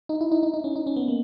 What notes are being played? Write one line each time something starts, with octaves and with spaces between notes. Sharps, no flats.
D#4
E4
D#4
D#4
D#4
C#4
D#4
C#4
B3
A#3